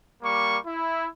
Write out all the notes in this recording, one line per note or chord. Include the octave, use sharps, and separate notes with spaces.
G3 A#3 C#6
E4